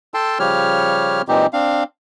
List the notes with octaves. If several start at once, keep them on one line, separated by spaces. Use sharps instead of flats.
A4 G5 A5 C6
C#3 F3 G3 G4 C#5 F6
A#2 E3 G#3 C4 D#4 G4
C4 D4 F5